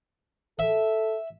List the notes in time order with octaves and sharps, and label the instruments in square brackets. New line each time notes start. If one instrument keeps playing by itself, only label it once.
[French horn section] A4 [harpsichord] E5